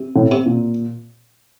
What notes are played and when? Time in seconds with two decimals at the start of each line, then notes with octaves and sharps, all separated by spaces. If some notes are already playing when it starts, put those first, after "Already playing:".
Already playing: C3
0.16 A2
0.31 C3
0.46 A#2